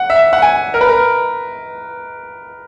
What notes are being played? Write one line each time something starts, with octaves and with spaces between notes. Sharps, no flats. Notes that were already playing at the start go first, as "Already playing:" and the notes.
Already playing: F#5
E5
F#5
G#5
A#4
B4
A#4